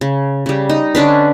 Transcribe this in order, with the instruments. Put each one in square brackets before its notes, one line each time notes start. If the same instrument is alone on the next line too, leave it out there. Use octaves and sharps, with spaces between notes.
[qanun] C#3
C#3 G3
D#4
D3 C#4 D4 B4